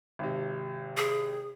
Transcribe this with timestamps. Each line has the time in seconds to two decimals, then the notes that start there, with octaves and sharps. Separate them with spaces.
0.19 G#1 C3
0.97 G#4